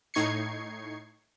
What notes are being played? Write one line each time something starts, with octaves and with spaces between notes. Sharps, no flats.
A2 D#4 C#6 G#6 C7 C#7